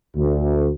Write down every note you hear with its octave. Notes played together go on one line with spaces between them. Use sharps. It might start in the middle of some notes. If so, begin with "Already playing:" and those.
D2